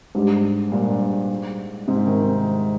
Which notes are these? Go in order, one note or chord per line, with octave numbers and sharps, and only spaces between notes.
G#2 G3 D4
G2 A#2
G#2 C3
C3 D#3